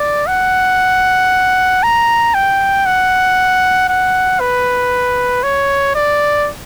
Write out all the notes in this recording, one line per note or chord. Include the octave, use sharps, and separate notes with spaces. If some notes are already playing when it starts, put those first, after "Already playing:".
Already playing: D5
F#5
A#5
G5
F#5
F#5
B4
C#5
D5